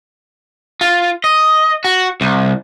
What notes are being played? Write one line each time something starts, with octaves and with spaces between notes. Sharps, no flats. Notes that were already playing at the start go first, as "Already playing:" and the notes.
F4
D#5
F#4
C2